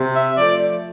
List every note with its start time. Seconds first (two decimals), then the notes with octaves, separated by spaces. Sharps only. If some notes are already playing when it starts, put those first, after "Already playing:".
Already playing: C3
0.14 E5
0.37 F3 A3 D5